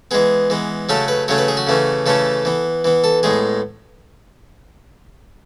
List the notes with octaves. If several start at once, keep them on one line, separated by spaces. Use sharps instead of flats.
E3 G#3 B3 G#4
E3 G#3 B3
C#3 F#3 A3 C#4 A4
B4
C#3 F#3 A3 C#4 C#5
B4
G#4
F#4
C#3 E3 A3 C#4
C#3 E3 A3 C#4 A4
E3 B3
E3 B3
A4
A2 G#3 B3 G#4